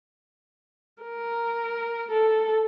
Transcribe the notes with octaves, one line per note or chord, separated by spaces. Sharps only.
A#4
A4